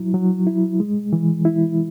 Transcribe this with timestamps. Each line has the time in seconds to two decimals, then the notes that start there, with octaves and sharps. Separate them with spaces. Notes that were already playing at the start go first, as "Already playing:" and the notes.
Already playing: F#3 E4
0.14 F#3
0.47 E4
0.80 G#3
1.13 E3
1.45 E4